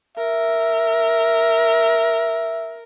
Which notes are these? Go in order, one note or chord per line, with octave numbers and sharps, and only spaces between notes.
A#4 E5